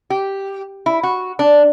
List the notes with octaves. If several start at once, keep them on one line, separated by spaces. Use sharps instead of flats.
G4
E4
F#4
D4